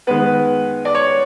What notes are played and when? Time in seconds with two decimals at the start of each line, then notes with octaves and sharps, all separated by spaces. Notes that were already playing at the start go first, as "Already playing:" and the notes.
0.07 D#3 G#3 B3 B4
0.85 D5
0.95 C#5